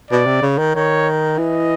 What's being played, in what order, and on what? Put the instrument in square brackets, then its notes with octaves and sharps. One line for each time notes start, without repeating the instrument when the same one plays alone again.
[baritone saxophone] B2 [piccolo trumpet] D5
[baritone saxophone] C3
C#3
D#3
[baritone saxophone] D#3 [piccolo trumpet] C#5
[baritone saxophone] E3 [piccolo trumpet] D#5